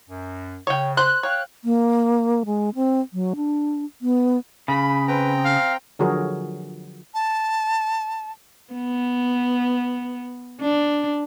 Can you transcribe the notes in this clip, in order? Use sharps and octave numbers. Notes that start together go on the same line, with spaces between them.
F#2
C#3 C#5 G5
C5 F#6
C#5 F5 G5
A#3
G#3
C4
F#3
D4
B3
C#3 B5
C4 B4 G5 A#5
F5
D3 F3 F#3 F#4 G#4 A#4
A5
B3
D4